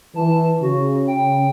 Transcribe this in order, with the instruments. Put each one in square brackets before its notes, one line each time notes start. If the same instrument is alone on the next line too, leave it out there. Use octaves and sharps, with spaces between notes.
[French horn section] E3 [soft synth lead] A5
[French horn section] C#3 [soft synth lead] F#4
[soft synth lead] G5